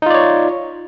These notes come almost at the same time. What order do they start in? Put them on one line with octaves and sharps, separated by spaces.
D#4 F4 D5 C#5